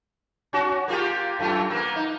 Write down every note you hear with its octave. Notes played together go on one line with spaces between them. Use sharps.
C#4 F#4
A#3 F4 G4
F#2 A3 F4
A#3 B3
D#4